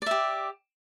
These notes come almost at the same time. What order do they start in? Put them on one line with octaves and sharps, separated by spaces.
D5 E5 G4